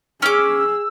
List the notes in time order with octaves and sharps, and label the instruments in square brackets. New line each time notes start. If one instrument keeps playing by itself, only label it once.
[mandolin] C#4 D6 [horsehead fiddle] G#4 [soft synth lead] E6